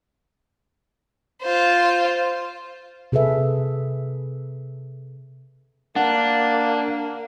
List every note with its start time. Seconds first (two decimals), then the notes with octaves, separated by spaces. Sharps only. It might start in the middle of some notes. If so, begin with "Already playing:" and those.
1.42 F4 C5
3.12 C3 G#4 A4 B4 E5
5.96 A#3 D4 F#5